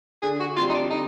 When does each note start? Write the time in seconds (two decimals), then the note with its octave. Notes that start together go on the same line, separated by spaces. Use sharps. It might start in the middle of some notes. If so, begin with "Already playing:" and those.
0.23 D3 G#4
0.40 F#4
0.57 G3 C4 F4
0.70 D#4
0.74 D4
0.90 D3 D#4